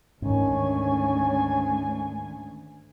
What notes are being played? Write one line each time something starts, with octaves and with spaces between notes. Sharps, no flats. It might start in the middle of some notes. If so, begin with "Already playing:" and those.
D2 G#2 D#3 C#4 G#5